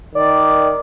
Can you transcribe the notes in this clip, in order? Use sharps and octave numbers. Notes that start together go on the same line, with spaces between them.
D#3 D5